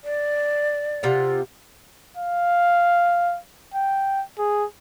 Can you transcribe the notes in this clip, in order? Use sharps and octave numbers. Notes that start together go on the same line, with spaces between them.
D5
C3 F4 F#5
F5
G5
G#4